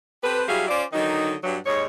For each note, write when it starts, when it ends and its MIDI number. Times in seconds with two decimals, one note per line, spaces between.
0.23 0.42 60
0.23 0.42 67
0.23 0.42 69
0.23 0.42 71
0.48 0.68 54
0.48 0.68 55
0.48 0.68 64
0.48 0.68 66
0.48 0.68 68
0.48 0.68 77
0.68 0.83 61
0.68 0.83 65
0.68 0.83 72
0.68 0.83 74
0.92 1.34 50
0.92 1.34 51
0.92 1.34 54
0.92 1.34 63
1.44 1.57 43
1.44 1.57 54
1.66 1.85 39
1.66 1.85 44
1.66 1.85 56
1.66 1.85 63
1.66 1.85 73